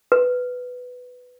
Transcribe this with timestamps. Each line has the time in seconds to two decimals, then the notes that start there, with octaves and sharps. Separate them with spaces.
0.12 B4